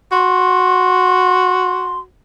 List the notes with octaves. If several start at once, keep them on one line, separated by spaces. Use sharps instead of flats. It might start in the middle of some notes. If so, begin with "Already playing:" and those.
F#4 C6